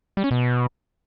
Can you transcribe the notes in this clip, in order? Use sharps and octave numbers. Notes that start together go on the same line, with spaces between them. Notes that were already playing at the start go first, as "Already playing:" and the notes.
G3
C#4
B2